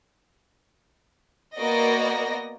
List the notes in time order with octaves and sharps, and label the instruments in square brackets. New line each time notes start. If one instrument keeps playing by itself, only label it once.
[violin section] A#3 B3 F#4 D5 D#5 A#6